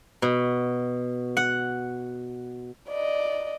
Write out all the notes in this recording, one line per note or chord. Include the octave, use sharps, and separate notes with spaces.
B2
F#5
D5 D#5